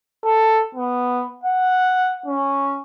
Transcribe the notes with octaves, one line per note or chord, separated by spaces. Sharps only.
A4
B3
F#5
C#4